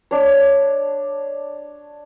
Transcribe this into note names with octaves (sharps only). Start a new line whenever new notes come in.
D4 C#5